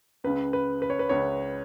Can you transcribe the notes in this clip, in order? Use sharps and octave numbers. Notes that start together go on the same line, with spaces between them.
C#2 C#3 B4
B4
B4
C#5
B4
C#2 C#3 C#5